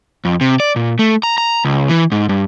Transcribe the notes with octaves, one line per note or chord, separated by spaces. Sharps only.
F2
C3
D5
A#2
A3
A#5
A#5
C#2
E3
G#2
G2